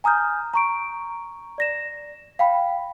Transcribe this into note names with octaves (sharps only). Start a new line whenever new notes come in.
G#5 A#5 D#6 F6 G6
A#5 C#6 D7
D5 A#6 E7
F5 G5 B5